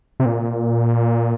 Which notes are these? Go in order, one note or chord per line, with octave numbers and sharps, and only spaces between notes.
C3
A#2